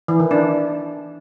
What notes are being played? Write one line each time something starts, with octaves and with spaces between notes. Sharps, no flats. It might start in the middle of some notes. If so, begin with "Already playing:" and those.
E3
D#3
D4